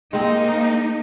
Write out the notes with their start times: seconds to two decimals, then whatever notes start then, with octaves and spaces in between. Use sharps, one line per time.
0.13 G#3 A#3 C4 D#4